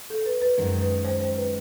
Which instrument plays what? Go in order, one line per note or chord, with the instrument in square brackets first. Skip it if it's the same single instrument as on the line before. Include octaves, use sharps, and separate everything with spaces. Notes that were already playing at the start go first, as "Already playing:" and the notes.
[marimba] A4
B4
B4
[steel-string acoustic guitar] F#2 D#3 G#3 C4 [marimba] A#4
[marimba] B4
C5
C5
B4